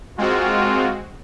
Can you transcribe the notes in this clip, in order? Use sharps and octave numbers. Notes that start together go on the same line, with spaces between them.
G#3 A#3 C4 F4 F#4